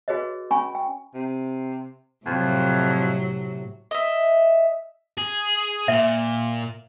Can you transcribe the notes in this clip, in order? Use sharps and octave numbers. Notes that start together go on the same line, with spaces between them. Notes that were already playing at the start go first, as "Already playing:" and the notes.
F#4 G#4 B4 C#5 D#5
C#4 G#5 B5 C#6
G5
C3
F2 A2 C3 F#3
D#5 E5
G#4
A#2 E5